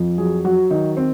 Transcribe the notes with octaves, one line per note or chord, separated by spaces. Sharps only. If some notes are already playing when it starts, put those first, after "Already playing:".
Already playing: F2 F3
F#3 G#4
F#3 F#4
D#3 D#4
C4